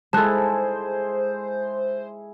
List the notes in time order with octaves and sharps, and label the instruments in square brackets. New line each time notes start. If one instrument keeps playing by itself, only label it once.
[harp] G#3 A4 [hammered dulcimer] E4 G#4 [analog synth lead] C5 [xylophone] A5 F#6